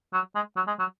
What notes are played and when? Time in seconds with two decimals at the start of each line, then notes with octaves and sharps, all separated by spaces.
0.13 F#3
0.35 G#3
0.56 F#3
0.67 G#3
0.79 F#3